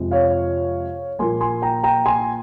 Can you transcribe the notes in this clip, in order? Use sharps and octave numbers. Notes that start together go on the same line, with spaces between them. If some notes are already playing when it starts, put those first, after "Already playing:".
Already playing: F2 C3 F3 G#3
C#5 F5
A#2 F3 A#3 G#5 C6
G#5 C6
G5 A#5
G5 A#5
G#5 C6